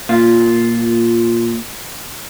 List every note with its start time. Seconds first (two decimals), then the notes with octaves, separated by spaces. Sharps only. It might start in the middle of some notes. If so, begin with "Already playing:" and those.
0.09 A#2 F4